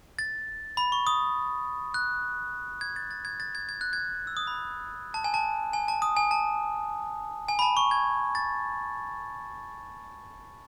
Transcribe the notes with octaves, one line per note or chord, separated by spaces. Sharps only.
A6
B5
C#6
D#6
F#6
G#6
A6
A6
G#6
A6
G#6
G#6
F#6
G#6
E6
D#6
B5
A5
G#5
A5
G#5
A5
D#6
G#5
A5
G#5
B5
A5
C#6
G#6
A6